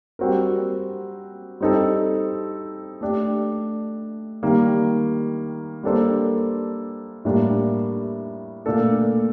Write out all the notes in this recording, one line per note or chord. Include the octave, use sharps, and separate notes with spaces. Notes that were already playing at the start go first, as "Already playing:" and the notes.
G3 C4 F#4 A#4
G3 C4 D#4 A4
A3 D4 G4
D#3 G3 A#3
G3 A#3 D4 A4 C5
A2 G3 A#3 D4
A#2 A3 D4 A4